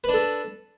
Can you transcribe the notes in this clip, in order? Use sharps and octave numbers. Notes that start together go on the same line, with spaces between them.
D4 A4 B4